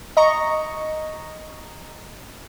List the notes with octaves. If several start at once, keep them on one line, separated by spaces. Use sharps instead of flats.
D#5 A#5 C#6